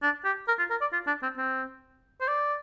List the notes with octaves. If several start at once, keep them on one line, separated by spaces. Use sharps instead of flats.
D4
G4
A#4
F4
A#4
D5
F4
D4
C4
C4
C5
D5